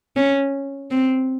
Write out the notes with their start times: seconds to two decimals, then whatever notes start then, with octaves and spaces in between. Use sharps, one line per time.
0.16 C#4
0.91 C4